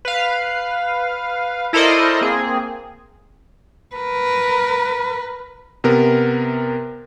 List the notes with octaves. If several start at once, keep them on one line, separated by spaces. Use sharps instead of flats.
B4 F5
E4 A4 A#4 C5 D5 D#5
A#3 C4 G#4
A#4 B4
C3 B3 A#4